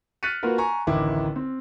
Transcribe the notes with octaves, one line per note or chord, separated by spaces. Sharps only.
F6 F#6 A6 B6 C#7 D#7
A#3 F4 F#4 A#4 B4
G#5 A#5 C#6
A1 D2 D#3 E4 D6
C4